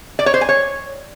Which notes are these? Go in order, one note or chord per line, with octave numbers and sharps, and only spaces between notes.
D5
C#5
C5
G#5
C#5